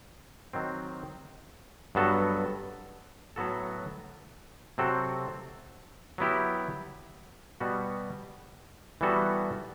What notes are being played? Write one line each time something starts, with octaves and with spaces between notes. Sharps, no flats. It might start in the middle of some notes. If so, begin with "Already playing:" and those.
D#3 F#3 C4
G2 F#3 B3 F#4 A4
A2 F#3 B3 F#4 A4
C3 F#3 C4 F#4 A4
F#3 B3 E4 G4
B2 G3 B3 F#4
E3 G3 B3 F#4 A4